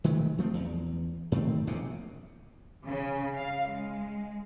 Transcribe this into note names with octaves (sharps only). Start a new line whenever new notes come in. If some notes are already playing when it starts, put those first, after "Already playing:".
D#3 G#3 A3
F3 A3 B3 C4
E2
G#2 D#3 A3 C4
E1 A#1 D#2 C3
C#3
F5
G#3